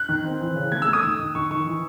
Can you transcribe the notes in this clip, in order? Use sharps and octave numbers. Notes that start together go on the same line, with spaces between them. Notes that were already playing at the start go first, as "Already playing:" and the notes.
Already playing: F#6
D#3
C4
E3
C#3
A3 G#6
E6
A3
D#6
D#3
D#3
D#3 C#6
D#3 C#6
E3